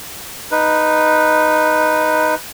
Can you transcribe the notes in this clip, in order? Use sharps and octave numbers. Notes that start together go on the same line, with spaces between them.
D#4 B4